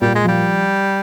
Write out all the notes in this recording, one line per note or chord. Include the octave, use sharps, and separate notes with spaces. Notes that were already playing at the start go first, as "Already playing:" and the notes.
A#2 G3
G#3
F3 G3